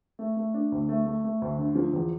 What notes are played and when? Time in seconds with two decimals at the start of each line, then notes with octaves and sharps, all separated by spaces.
0.19 A3
0.37 A3
0.54 D4
0.72 D2
0.89 A3
1.06 A3
1.24 A3
1.42 D2
1.58 D3
1.75 F3
1.93 E2